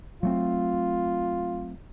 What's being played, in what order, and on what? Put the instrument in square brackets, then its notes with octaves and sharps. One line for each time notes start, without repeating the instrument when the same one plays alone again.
[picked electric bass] F#3 A3 C4 [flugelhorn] F4